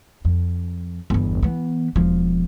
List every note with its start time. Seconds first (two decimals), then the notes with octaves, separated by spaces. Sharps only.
0.25 F2
1.10 G1 E2
1.43 E3 B3
1.96 E1 F3